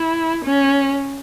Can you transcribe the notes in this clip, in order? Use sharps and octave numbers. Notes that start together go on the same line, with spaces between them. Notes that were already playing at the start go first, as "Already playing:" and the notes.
Already playing: E4
C#4